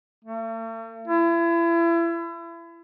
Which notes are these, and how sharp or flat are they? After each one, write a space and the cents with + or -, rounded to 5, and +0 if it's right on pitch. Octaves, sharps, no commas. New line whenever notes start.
A3 +45
E4 +35